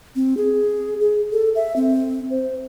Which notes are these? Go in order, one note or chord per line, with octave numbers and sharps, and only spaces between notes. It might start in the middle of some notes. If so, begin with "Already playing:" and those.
C4
G#4
G#4
A4
E5
C4
C5